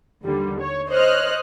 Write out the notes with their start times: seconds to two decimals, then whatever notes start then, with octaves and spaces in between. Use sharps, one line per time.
0.24 D#2 D3 G3
0.61 C#5
0.90 C5 C#5 D#5 F6 F#6